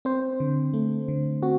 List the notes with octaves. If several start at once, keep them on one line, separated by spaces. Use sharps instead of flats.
C4 C5
D3
A3
D3
C4 F#4